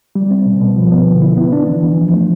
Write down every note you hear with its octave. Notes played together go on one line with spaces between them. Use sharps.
G3
C4
B2
B2
F3
B3
D3
E4
B3
D4
E3
E3
F3
A3